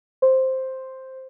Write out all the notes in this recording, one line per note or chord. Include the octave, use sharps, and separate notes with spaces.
C5